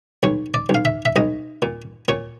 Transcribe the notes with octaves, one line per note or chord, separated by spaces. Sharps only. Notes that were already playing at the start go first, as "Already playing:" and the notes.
B1 C#5
D5
B1
F5
E5
E5
B1 D#5
A#2
A#2 C#5